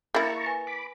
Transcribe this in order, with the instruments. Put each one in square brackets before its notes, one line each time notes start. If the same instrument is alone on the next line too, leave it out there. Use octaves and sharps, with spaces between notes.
[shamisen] A#3 E4 [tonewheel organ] A5 A#5 C#6
[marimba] B4 G#5
[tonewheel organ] B5 D6